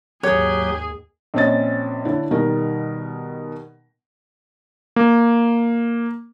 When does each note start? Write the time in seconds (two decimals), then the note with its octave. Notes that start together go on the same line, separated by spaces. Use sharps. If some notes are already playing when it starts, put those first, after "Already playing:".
0.23 D#2 G#2 F#3 G4 G#4 C#5
1.34 A#1 C4 C#4 C#5 D#5 A6
2.05 D3 E4 C#5
2.31 B2 D#3 G3 A#4
4.96 A#3